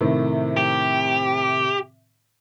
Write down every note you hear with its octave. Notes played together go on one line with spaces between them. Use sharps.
A2 C3 D#3
G4